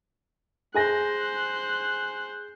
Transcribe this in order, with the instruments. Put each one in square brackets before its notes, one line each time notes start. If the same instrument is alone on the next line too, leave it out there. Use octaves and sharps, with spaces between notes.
[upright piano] G#4 G#5 A#6 [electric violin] C5 F#6